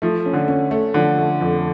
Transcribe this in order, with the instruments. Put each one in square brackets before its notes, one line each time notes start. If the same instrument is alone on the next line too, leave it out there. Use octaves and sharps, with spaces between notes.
[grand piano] F3 [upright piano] A3
[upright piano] C#4
[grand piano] D3
[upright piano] C#4
A3
[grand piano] D3 [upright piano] F3
[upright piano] A3
F2